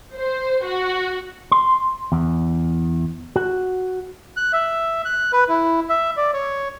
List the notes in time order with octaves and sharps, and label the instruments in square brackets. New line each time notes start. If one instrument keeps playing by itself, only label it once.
[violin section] C5
F#4
[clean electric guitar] C6
E2
F#4
[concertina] F#6
E5
F#6
B4
E4
E5
D5
C#5